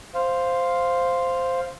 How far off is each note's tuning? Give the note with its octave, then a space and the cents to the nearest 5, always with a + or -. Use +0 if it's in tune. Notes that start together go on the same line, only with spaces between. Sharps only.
C5 +0 F5 +0